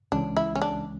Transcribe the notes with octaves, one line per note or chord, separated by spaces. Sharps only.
C#2 C#3 E3 G#3 C#4 D4
E4
C#4
D4